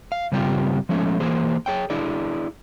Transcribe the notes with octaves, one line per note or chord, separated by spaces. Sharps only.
F5
G2 C#3 G3 C4 F4 G4
F3 G#3 A3 C#4
E3 A#3 G#4 C5
G#4 C#5 G5
D4 E4 G#4 D5